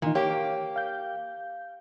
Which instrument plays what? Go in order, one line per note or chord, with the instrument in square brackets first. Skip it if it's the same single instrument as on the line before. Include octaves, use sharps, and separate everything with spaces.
[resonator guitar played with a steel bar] A#2 [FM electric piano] D#3 E3 D#4
[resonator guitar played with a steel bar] A#3 G4 [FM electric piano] C#5 F5
[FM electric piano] F5 G6